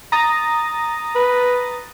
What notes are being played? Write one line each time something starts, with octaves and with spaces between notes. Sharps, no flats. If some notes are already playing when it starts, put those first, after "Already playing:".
A#5 D#6 A6
B4